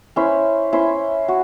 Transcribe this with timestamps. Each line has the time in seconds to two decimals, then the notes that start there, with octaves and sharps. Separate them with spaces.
0.16 C#4 E4 C5
0.73 C#4 E4 C5
1.28 F#4